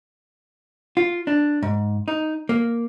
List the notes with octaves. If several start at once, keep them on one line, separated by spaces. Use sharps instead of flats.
F4
D4
G#2
D#4
A#3